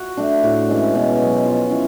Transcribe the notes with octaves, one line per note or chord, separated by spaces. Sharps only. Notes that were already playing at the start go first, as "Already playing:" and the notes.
Already playing: F#4
A3 D4
A2 F#4
E3 G#3 C#4
B2
F#3 B3
F3 F4
G#3 C#4 E4